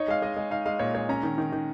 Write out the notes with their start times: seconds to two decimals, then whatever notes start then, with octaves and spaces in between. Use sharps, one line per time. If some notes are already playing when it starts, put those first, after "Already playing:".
Already playing: D#4 C#5
0.08 G#3 F5
0.22 G#3 D#5
0.37 G#3
0.50 D#4 F5
0.66 G#3 F5
0.79 A#2 C#5
0.94 G#3 C#5
1.09 C#4 A#5
1.23 D#3
1.38 D#3
1.52 D#3